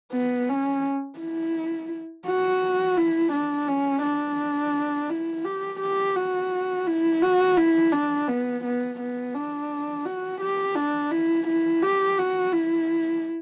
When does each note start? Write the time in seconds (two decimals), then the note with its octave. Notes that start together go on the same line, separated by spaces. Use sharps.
0.13 B3
0.49 C#4
1.20 E4
2.26 F#4
2.97 E4
3.33 D4
3.68 C#4
4.03 D4
5.10 E4
5.45 G4
5.80 G4
6.16 F#4
6.87 E4
7.22 F#4
7.57 E4
7.92 D4
8.28 B3
8.64 B3
9.00 B3
9.35 D4
10.05 F#4
10.41 G4
10.76 D4
11.11 E4
11.47 E4
11.82 G4
12.18 F#4
12.53 E4